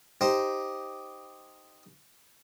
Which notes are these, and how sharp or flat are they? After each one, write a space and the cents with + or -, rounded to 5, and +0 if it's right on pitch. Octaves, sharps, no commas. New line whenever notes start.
D#4 +0 G4 +0 C5 +0